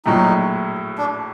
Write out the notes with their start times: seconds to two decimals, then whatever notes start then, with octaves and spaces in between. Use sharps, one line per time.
0.05 A#1 A2 F#3 D#4
0.98 D4